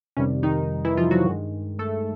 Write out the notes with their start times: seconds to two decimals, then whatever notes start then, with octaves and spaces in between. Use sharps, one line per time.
0.17 F2 C3 D#3 G3 C#4
0.43 D#3 D#4
0.85 E3 E4
0.97 F3 F4
1.11 F#3 F#4
1.25 G2 D#3 G#3
1.79 A3 A4